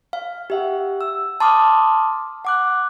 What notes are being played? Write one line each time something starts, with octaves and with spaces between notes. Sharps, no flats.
F5
G4 E5 F#5
E6
A5 C6 D6 D#6 F6
F#5 D6 F#6